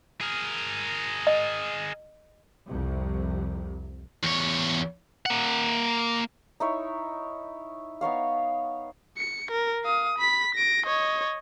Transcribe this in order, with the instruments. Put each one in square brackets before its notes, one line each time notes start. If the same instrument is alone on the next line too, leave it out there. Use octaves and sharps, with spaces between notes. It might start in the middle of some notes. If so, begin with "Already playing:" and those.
[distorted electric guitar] G#4 A#4
[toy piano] D#5
[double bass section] C2 F2 C3
[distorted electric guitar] E2 C#5
A#3 F#5
[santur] D#4 E4 C#5
B3 D#4 C#5 F5
[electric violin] C#7
A#4
F5 D#6
B5 B6
A#6 D7
C#5 D#5